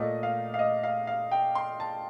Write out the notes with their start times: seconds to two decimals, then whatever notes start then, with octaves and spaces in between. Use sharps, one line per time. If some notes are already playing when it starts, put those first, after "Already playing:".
Already playing: A#2 A3 D#5
0.23 F5
0.54 F5
0.59 D#5
0.83 F5
1.07 F5
1.32 G5
1.55 C6
1.80 A5